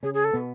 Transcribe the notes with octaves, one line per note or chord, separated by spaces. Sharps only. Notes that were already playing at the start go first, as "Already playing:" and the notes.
C#3 C#4 G#4
G#4
A4
B2 B3